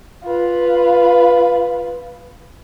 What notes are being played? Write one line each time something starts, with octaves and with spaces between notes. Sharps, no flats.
F4 B4